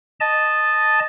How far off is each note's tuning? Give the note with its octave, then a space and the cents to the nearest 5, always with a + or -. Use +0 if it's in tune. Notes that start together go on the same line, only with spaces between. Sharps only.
D#5 -10 A5 -5